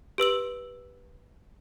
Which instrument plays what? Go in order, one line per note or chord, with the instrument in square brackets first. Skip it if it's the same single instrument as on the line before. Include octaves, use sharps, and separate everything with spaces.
[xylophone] G4 B4 E6 F#7